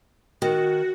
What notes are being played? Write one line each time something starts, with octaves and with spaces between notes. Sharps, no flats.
D#3 F#4